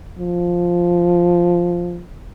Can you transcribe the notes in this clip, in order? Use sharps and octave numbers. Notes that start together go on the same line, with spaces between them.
F3